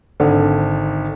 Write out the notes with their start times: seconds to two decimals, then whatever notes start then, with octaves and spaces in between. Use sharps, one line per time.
0.20 G#1 D3